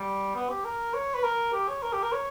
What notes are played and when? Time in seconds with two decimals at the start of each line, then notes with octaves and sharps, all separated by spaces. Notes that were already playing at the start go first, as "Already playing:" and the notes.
Already playing: G3
0.35 B3
0.50 G4
0.64 A#4
0.94 C#5
1.14 B4
1.24 A#4
1.53 G4
1.68 C#5
1.83 A#4
1.93 G4
2.03 A#4
2.12 C#5